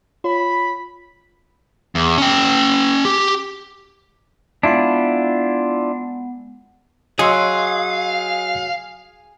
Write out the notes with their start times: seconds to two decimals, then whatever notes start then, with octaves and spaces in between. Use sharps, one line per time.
0.24 F4 C#5 B5
1.95 E2
2.18 C#4 G5
3.05 G4
4.63 G#3 B3 D4 E4 F4 F#5
7.19 F#3 G#4 D#5 F5 C6 E6